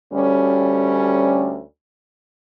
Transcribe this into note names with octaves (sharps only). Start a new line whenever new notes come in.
D2 G3 C#4